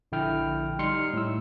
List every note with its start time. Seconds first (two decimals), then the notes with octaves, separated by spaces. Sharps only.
0.12 A#1 D3 E4 G5 F6
0.79 G3 D#4 C6 F6 C#7
1.13 A2 E6